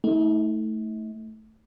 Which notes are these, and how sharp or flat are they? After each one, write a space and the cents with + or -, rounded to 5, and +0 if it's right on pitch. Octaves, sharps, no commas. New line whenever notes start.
A3 +0 D#4 +45